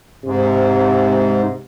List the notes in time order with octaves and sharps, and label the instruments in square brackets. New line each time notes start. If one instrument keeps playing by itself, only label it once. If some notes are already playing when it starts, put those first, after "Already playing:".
[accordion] G#2 [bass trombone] C3